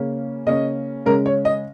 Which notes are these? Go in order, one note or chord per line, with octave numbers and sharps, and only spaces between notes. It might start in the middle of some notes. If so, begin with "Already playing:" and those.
Already playing: C#3 A#3 C#4
C#3 A#3 C#4 D#5
C#3 G#3 C#4 A#4
C#5
D#5